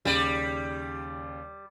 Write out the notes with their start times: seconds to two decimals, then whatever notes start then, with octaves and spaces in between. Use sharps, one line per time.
0.05 D#2 C#3 G3 D5